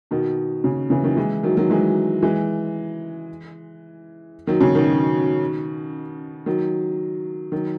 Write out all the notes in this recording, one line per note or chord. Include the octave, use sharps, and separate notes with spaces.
B2 D#3
C#3
C#3 E3
D#3 F#3
E3 G#3
D#3 F#3
D#3 F#3
E3 G#3
E3 G#3
D#3 F#3
C#3
B2 D#3
D#3 F#3
D#3 F#3